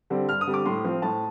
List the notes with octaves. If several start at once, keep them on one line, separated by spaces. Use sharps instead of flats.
D3 G3 C4
G2 F6
D#6
D3 G3 C4
D6
A2 C6
F3 C4
A2 A5